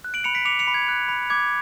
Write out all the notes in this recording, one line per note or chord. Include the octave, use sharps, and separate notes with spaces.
F#6
D7 F#7
B5 C#7 F7
B6 D7
D6 C#7 F7
C#7 F7
B5
G#6
F#6
B5
D6 G#6